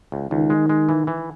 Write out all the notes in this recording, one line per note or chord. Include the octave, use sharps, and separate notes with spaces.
C#2
C#2 D#3
G#3
G#3
E3
E3